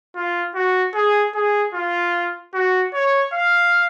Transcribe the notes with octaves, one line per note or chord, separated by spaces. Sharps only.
F4
F#4
G#4
G#4
F4
F#4
C#5
F5